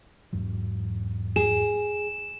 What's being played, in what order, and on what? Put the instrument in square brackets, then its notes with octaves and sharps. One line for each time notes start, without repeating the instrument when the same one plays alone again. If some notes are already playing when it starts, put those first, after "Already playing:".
[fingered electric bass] E2 G#2 F#3
[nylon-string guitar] G#4 [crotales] E7